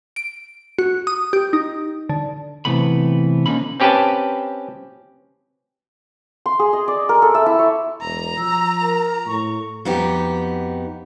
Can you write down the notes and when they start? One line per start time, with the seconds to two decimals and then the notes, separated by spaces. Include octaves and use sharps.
0.16 D7
0.79 F#4
1.07 D#6
1.33 G4
1.53 D#4
2.09 D3
2.65 C3 E3 A3 B3 B5
3.46 D3 A#3 C#4 D#4 E4 B5
3.80 C4 C#4 G4 B4 G5 A5
6.46 C6
6.59 G#4
6.73 D#5
6.88 D5
7.09 A#4
7.22 A4
7.35 E5
7.46 E4
7.59 C#5
8.02 E1 A#5
8.38 F3 E6
8.81 A#4
9.27 A2 C#6
9.85 F2 B3 D#4 F#4 G4